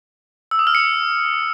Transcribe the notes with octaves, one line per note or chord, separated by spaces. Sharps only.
E6
D#6
F6
C#7